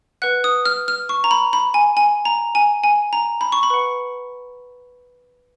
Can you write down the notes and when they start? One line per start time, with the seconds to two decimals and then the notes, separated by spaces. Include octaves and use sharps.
0.22 B4 F#5 F#6
0.44 D#6
0.65 F6
0.88 F6
1.09 C#6
1.24 A#5
1.31 B5
1.53 B5
1.74 G#5
1.97 G#5
2.25 A#5
2.55 G#5
2.84 G#5
3.13 A#5
3.41 B5
3.52 C#6
3.63 B5
3.70 B4 F#5